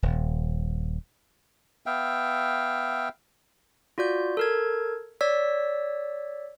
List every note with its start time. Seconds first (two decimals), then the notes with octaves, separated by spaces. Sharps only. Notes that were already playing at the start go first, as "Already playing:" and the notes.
0.03 D#1
1.86 B3 E5 F5 G5
3.98 F4 F#4 D5 G6
4.37 A4 A#4 G#6
5.21 C#5 D5 E6 B6